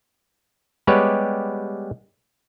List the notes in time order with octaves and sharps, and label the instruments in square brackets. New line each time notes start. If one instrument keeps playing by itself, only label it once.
[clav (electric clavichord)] G3 G#3 B3 G4 B4 C#5